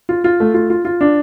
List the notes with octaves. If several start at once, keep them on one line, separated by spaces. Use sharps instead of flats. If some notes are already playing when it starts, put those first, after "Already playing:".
F4
F4
A3
F4
F4
F4
D4